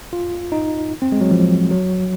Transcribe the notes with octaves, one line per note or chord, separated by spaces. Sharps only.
F4
D#4
C4
G#3
F#3
F3
F#3